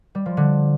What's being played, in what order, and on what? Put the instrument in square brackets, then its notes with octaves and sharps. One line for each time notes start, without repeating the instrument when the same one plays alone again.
[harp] G3
F3
D3